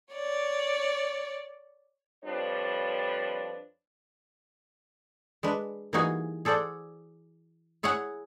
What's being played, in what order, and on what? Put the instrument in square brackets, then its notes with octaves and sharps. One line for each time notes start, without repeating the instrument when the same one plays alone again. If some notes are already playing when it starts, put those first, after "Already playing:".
[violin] C#5 D5
[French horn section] F2 F3 G3 D4 B4 C#5
[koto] G#3 D4 B4
E3 G3 A#3 D#4 F#4 G#4
G#4 A4 C5 D5 F#5
E4 G#4 C#5 E5 F#5